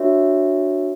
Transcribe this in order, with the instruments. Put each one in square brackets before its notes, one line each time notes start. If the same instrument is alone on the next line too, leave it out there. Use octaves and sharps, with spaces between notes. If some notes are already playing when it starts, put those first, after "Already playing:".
Already playing: [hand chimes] D4 F#4 A#4 C#5 E5